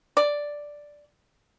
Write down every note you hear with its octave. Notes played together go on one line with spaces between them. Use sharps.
D5